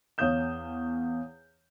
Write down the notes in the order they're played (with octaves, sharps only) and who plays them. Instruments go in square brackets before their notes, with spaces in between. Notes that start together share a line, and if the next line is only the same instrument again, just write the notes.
[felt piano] E2 C#5 F5 D#6 G6 E7